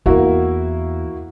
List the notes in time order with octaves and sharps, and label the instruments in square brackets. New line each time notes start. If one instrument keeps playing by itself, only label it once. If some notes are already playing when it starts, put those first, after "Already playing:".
[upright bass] E2 [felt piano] A#3 E4 F#4